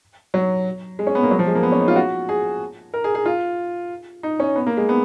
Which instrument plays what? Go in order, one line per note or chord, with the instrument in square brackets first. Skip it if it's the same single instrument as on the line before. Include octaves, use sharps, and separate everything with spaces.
[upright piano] F#3
G#3
C#4
B3
A#3
F#3
F3
G#3
A#3
B3
C#4
D#4
F4
F#4
G#4
A#4
G#4
G#4
F4
D#4
C#4
B3
A#3
G#3
B3